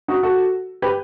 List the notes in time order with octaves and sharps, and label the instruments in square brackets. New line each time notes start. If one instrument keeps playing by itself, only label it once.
[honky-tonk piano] D#4 F#4
F#4 A4
G4 B4